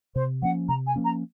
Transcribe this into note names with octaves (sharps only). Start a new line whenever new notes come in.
C3 C5
F3 A#3 C#4 F#5
C3 A#5
G#5
F3 A#3 C#4
A#5